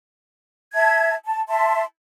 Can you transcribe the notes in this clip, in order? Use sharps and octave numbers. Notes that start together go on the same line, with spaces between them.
E5 A5 G#6
A5
E5 A5 C6